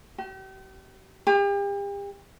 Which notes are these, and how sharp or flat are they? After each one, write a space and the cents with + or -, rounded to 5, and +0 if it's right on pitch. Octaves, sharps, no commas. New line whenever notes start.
G4 -40
G4 +40